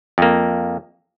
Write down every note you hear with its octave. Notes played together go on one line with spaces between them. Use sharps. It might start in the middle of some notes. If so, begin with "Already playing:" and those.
F2 A#3